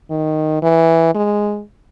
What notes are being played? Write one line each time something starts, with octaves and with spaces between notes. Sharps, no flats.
D#3
E3
G#3